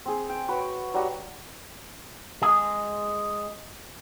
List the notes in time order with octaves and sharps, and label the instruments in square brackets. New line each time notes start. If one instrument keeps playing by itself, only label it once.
[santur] C4 G#4
G5
F#4 B4 C#5
F#3 G3 F#4
[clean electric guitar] G#3 G#4